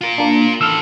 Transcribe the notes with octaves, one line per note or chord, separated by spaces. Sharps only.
F4 A#4
A#3 D4
E3 A4 E6 F6